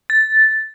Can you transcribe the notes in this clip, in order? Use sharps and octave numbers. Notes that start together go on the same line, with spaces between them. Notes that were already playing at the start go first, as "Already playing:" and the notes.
A6